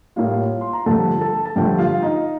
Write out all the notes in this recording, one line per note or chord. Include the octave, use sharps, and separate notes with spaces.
A2 G3 A#3 F4 F5
C6
A#5
G2 D3 F3 A3 A4 A5
A4 A5
A5
G2 D3 F3 A3 G4 G5
F4 F5
D#4 D#5